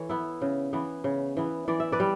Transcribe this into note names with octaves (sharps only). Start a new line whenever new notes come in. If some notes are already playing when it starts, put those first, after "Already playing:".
Already playing: E3 A4 C#5
B3 E4
C#3
E3 B3
C#3
E3 B3
E3 D5
E5
B4 D5
G3